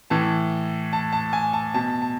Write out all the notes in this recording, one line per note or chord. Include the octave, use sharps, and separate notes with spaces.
A2 E3 A5
A5
A5
G#5
A5
B2 A5
A5